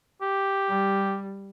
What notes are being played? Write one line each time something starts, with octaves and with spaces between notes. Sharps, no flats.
G4
G3